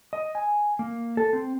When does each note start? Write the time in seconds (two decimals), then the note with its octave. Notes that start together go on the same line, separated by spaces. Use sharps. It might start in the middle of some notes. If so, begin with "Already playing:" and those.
0.13 D#5
0.35 G#5
0.79 A#3
1.17 A4
1.33 C4